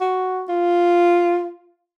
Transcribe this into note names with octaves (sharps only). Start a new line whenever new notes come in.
F#4
F4